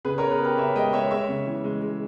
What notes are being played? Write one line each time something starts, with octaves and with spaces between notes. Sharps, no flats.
C#3 G#4 B4
A#4 C#5
B3
G#4 B4
B3 G4 A#4
C#3 C#5 E5
G#3 D#5 G5
G#3 C#5 E5
G#3 C#5 E5
C#3
E3
G#3
G#3